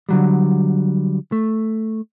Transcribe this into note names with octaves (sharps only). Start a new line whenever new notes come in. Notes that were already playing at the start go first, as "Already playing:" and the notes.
D3 F#3 G3
A3